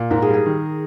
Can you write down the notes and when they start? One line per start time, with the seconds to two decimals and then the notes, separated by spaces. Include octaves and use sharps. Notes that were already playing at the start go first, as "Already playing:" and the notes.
Already playing: A#2
0.10 G#2 A#4
0.22 G#4
0.28 G3
0.34 G#4
0.46 D#3